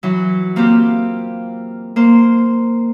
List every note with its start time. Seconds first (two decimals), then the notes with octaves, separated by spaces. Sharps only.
0.03 E3 F#3
0.56 A#3 C4 F4 G4
1.96 A#3 C5